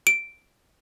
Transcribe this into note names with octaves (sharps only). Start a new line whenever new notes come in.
D7